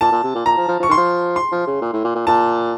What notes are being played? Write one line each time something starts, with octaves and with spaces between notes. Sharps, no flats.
A#2 A5
A#2
C3
A#2
A#2 A#5
F3
F3
F3 C#6
D#3 C6
F3
C6
F3
C#3
A#2
A2
A#2
A#2
A#2 A5